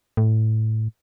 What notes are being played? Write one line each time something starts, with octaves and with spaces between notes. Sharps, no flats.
A2